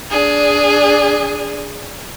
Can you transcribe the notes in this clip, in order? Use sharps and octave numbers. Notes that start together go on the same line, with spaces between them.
D4 G#4